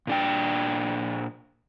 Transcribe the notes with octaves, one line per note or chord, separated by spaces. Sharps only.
A#2 D4 G5